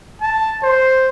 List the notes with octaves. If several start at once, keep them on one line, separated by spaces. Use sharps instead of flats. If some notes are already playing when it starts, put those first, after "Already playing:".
A5
C5